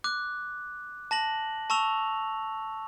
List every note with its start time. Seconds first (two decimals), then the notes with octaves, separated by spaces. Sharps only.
0.04 D6 F#6
1.11 A5 A#6 F#7
1.70 A5 C#6 E6 F7